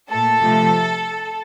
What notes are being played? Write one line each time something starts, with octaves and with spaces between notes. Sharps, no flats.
A#2 A3 A4
C3 F3 A3